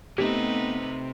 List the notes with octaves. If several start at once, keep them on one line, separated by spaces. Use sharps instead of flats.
C3 A3 B3 C4 D#4 G4 B4